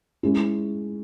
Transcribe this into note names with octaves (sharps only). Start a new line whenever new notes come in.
G#3 C#4 E4